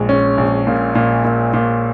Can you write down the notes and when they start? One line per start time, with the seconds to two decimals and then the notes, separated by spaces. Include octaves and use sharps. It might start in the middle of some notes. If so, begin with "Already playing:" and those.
Already playing: A#1 G#3
0.09 C#4
0.38 A#1
0.67 A#2
0.95 A#2
1.24 A#2
1.54 A#2